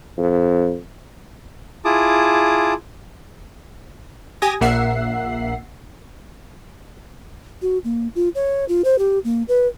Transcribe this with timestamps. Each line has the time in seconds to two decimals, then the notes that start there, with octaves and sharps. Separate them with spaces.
0.18 F2
1.85 E4 F4 G#4 A5 D6 D#6
4.42 G4 G#5 D#6 A#6
4.61 A#1 A#2 A#3 E5 F#5 C7
7.62 F#4
7.84 A#3
8.15 F4
8.35 C#5
8.68 F4
8.84 C5
8.98 G4
9.24 A#3
9.48 B4